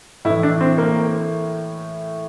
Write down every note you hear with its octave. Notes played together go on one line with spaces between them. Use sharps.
A2 E4
E3
D4
C4
A#3